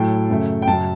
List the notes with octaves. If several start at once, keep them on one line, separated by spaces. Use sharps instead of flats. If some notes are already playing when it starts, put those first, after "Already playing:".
Already playing: A2 F#3 A3 G5
F#2 C#3 F#3 A3
G5
F#2 C#3 F#3 A5